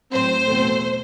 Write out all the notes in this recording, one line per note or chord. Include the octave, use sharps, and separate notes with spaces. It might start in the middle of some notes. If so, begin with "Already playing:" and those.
A2 F#3 C4 C5
E2 B2 A3 C4